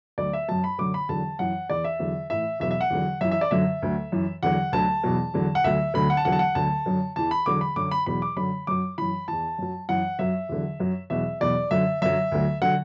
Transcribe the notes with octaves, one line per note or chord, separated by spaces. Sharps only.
D2 D3 F#3 D5
E5
F#2 F#3 A5
B5
F#2 D3 F#3 D6
B5
E2 D3 F#3 A5
F#2 E3 F#5
E2 E3 D5
E5
E2 D3 F#3
A2 E3 E5
E2 B2 F#3 E5
E5
F#5
E2 D3 F#3
F#2 E3 E5
E5
D5
F#2 D3 F#3 E5
D2 D3 F#3
F#2 E3
E2 D3 F#3 F#5
D2 D3 F#3 A5
E2 B2 F#3
E2 D3 F#3
F#5
D2 D3 F#3 E5
D2 D3 F#3 B5
F#5
A5
E2 D3 F#3 F#5
A5
F#5
D2 D3 F#3 A5
F#2 D3 F#3
E2 E3 A5
B5
E2 D3 F#3 D6
B5
F#2 D3 F#3 D6
B5
E2 B2 F#3 B5
D6
F#2 D3 F#3 B5
F#2 F#3 D6
F#2 E3 B5
E2 E3 A5
F#2 F#3
F#2 E3 F#5
F#2 F#3 E5
E2 D3 F#3
F#2 F#3
E2 B2 F#3 E5
E2 B2 F#3 D5
F#2 D3 F#3 E5
F#2 D3 F#3 E5
D2 D3 F#3
D3 F#3 F#5